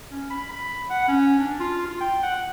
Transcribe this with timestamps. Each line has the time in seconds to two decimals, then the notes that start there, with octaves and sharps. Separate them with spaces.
0.11 C#4
0.30 B5
0.51 B5
0.90 F#5
1.08 C#4
1.39 D4
1.60 F4
1.86 F4
2.00 G5
2.23 F#5